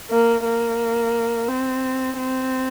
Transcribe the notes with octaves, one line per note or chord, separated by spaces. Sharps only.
A#3
A#3
C4
C4